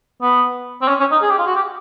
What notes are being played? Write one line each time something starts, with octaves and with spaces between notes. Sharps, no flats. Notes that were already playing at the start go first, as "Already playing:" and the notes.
B3
C4
C#4
C#4
D#4
G#4
G4
F4
F#4
G4